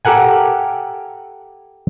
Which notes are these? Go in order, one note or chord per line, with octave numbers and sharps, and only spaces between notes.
G4 A4 A#4 F#5 G#5